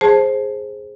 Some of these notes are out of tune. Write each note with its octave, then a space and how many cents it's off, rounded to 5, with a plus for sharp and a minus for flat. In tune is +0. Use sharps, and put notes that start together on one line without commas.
G#4 +0 C5 +15 A5 +0